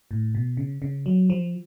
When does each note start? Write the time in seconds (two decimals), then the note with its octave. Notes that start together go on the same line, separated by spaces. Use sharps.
0.11 A2
0.35 B2
0.57 C#3
0.82 C#3
1.06 F#3
1.30 F3